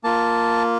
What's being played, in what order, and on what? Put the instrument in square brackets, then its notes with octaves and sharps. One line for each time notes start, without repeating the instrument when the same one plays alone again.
[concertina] A#3 F4 A5